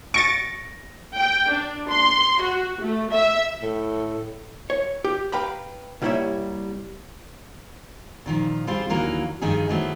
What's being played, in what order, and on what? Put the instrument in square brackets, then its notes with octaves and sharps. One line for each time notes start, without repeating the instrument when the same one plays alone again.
[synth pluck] C#6 A6 [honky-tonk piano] A#6 D7
[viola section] G5
D4
C6
F#4
A3
E5
[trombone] A2 [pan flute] A4
[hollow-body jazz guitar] C#5
G4
B4 F5 G5 A#5 B5
C2 G3 A#3 E4 C#5 E5
[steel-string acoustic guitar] A#2 D#3 F3
G3 C4 F4 G#4 C5
D#2 D3 E3 F#3 A#3 A#4
G2 D#3 F3 D#4 G#4
D#3 E3 F#3 A3 B3 C4